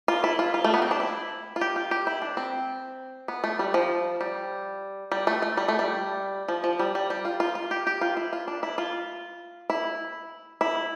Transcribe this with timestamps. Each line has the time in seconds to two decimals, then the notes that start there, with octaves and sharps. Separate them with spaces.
0.08 F4
0.24 E4
0.39 F4
0.54 F4
0.64 A3
0.74 B3
0.82 C4
0.91 D4
1.00 E4
1.56 F4
1.61 G4
1.76 F4
1.91 G4
2.07 E4
2.22 D4
2.37 C4
3.28 B3
3.44 A3
3.59 G3
3.74 F3
4.21 G3
5.12 G3
5.27 A3
5.42 A3
5.57 G3
5.68 A3
5.79 G3
6.48 F3
6.64 F3
6.79 G3
6.95 G3
7.10 G3
7.25 F4
7.40 F4
7.55 F4
7.71 G4
7.87 G4
8.01 F4
8.17 E4
8.33 F4
8.48 D4
8.63 E4
8.78 F4
9.70 E4
10.61 E4